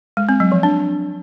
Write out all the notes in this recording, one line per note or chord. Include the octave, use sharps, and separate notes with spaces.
G#3
C4
F#3
F3
D4